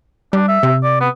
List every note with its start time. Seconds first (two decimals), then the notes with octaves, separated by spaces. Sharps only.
0.33 G3 D4
0.48 E5
0.63 C3
0.83 D5
1.01 B3